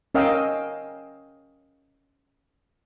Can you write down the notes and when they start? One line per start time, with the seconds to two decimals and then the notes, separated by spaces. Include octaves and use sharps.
0.15 C#4 A#4 D#5 F5 G5 E6